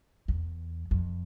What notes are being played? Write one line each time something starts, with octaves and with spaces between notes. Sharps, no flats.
E2
F2